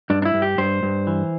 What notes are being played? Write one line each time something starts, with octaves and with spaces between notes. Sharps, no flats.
G2 D4
D4
E4
G2
G4
G2 C5
G2
E3